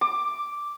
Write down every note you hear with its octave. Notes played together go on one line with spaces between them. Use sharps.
D6